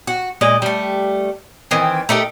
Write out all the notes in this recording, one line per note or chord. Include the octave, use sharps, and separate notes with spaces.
F#4
A#2 G#3 D5 D#5
G3 A3
D#3 E3 C4
A3 D#4 G4 A#4